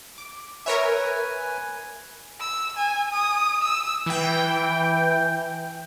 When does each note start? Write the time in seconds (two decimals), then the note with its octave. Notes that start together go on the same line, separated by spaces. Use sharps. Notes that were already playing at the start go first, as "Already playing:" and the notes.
0.18 D6
0.66 A#4 B4 C#5 E5 G#5
2.40 E6
2.77 G#5
3.13 D#6
3.63 E6
4.06 E3 G5